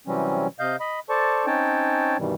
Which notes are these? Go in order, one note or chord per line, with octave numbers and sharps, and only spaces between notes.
C3 E3 F#3 G3 C4 C#4
C3 D#5 F5 G6
D#5 B5
A4 C5 D5 A5 C#6
C4 C#4 D#4 C#5 G5 A5
G2 B2 D#3 E3 G3